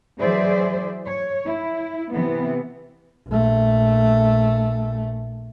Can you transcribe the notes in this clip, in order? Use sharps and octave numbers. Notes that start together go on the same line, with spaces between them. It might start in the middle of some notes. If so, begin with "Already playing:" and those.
E3 F#3 G#4 C5 D5 E5
C#5
E4
C3 E3 B3
A#1 A3